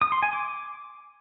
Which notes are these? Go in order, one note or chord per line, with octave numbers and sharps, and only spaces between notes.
D#6
C6
G#5
D6